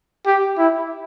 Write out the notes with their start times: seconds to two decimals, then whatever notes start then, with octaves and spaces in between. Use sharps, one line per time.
0.26 G4
0.58 E4